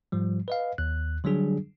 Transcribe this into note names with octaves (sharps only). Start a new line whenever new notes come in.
G#2 F3 G3
B4 D#5 F5
D#2 F#6
D3 F#3 G3 D4 G#4